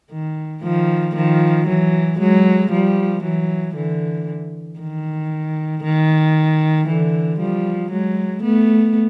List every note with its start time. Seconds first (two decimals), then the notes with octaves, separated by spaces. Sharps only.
0.11 D#3
0.63 D#3 F3
1.15 D#3 F3
1.67 E3 F#3
2.19 F#3 G#3
2.71 F3 G3
3.23 E3 F#3
3.75 D3 E3
4.79 D#3
5.83 D#3
6.87 D3 E3
7.39 F3 G3
7.91 F#3 G#3
8.43 A3 B3